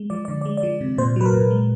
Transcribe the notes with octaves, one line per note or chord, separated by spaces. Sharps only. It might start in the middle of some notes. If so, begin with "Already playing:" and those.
Already playing: G#3
F3 D5
D5
D3
D5
G#3
D5
F3
C3
A#2 C5
F#3 B4
A#4
A#2
G#3